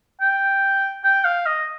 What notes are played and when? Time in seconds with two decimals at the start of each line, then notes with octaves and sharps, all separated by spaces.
0.21 G5
1.04 G5
1.25 F5
1.46 D#5